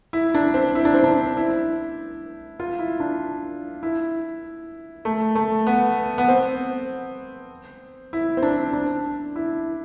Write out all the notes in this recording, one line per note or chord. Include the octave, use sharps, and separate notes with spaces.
E4
D4
C4
E4
D4
C4
D4
E4
F4
E4
D4
E4
A3
A3
B3
B3
C4
E4
C4
D4
D4
E4